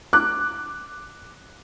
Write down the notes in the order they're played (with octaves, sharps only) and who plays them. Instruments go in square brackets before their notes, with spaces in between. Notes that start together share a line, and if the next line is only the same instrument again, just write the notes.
[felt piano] D6 F#6